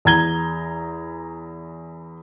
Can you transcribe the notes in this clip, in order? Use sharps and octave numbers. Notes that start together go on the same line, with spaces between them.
E2 A#5 G#6 G7